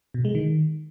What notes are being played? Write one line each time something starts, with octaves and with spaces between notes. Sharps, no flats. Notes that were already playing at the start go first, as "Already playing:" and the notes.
B2
G#3
D#3